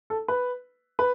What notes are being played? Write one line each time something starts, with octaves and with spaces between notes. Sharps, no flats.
A4
B4
B4